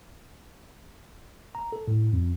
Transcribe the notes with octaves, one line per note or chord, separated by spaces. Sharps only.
A#5
A4
A2
F2